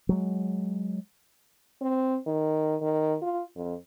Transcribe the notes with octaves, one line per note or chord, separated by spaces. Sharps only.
F#3 G#3
C4
D#3
D#3
F4
F2